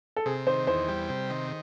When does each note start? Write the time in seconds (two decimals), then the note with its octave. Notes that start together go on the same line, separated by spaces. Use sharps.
0.16 A4
0.26 C3 G#4
0.47 D#3 C5
0.67 E2 C5
0.88 G3
1.09 C3
1.30 D#3